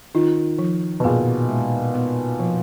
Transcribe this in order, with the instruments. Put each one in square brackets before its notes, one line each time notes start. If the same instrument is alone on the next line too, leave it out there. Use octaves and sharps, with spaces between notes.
[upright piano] D#3 [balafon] F4
[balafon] F3
[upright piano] B2
[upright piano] A#2 [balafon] G#4
[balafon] G#3
B3
F3